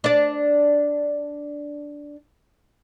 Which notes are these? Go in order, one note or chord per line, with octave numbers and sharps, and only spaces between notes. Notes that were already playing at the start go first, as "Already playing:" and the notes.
D4 D5